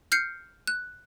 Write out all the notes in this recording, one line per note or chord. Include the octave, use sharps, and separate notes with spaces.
F6 G6 C7 C#7
F#6